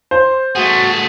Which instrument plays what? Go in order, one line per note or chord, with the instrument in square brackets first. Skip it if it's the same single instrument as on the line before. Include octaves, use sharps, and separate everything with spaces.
[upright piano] C5
[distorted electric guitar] A3 G#4 [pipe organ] F#4